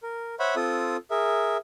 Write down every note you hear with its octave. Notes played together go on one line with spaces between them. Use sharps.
A#4
C5 C#5 E5 F#5 B5
C4 F4 A4 D#6
G#4 A#4 E5